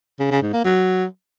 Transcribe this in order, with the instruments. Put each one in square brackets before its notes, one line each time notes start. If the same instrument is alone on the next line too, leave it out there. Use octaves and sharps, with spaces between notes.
[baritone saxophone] C#3
C#3
G#2
A#3
F#3